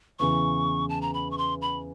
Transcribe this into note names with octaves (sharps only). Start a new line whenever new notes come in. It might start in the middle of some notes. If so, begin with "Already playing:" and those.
E2 C#3 E3 C#6
A5
A#5
B5
C#6
C6
B5